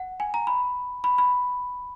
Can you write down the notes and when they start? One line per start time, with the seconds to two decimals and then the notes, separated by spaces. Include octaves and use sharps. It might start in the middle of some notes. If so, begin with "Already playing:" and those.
Already playing: F#5
0.20 G#5
0.34 A#5
0.47 B5
1.04 B5
1.18 B5